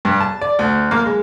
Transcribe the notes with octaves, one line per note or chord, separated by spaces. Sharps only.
G2
A5
D5
D2
A#3
G#3